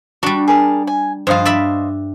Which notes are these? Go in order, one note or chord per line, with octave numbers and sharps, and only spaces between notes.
G3 D4 F#4
G#4 A#4 A5
G#5
G2 F3 C5 D#5 F5
D5 E5 B5